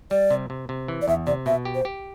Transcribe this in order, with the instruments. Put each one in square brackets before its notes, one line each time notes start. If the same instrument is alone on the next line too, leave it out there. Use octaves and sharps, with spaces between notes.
[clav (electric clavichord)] G3 [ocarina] D5
[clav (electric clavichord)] C3
C3
C3
E3
[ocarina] D5
[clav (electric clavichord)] E2 [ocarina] E5
[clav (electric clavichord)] C3 [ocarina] D5
[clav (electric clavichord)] B2 [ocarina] E5
[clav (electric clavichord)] G4
[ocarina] C5
[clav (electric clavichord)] G4